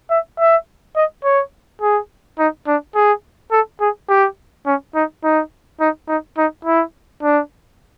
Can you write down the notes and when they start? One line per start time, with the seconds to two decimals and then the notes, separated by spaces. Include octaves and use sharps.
0.10 E5
0.39 E5
0.96 D#5
1.24 C#5
1.82 G#4
2.39 D#4
2.67 D4
2.95 G#4
3.52 A4
3.81 G#4
4.09 G4
4.66 C#4
4.95 D#4
5.24 D#4
5.81 D#4
6.08 D#4
6.38 D#4
6.65 E4
7.23 D4